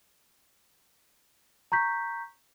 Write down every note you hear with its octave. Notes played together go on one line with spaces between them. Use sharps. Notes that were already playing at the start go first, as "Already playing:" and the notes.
A#5 C#6 G6 B6